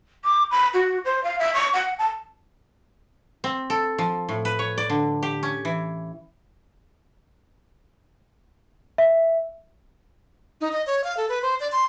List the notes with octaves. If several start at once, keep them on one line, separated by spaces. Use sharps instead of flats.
D6
B5
F#4
C5
F5
E5
C#6
F#5
A5
C4
A4
F3
A2
B4
C#5
D5
D3
G4
C#4
E3
E5
D#4
D#5
C#5
F5
A4
B4
C5
D5
C6